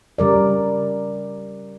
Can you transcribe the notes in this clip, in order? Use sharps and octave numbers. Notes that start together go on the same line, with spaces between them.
C#3 G3 A#4 D5